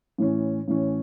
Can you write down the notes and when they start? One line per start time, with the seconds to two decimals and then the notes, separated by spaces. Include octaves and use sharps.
0.18 A2 E3 C#4
0.68 A2 E3 C#4